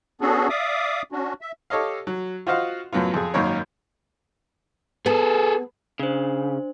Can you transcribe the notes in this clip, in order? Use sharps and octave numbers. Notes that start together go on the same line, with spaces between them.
B3 C#4 D4 F#4 G#4 A4
D5 E5 F5 D6 D#6
C#4 D4 F#4
E5
G4 A4 C#5 D#5 F5
F#3
F4 F#4 C5 D#5 F5 F#5
F#2 A2 F#3 B3 F4
F2 G#4
G#1 F#2 D#3 A#3 A#4 C#5
B3 G#4 A4
C#3 D4 C5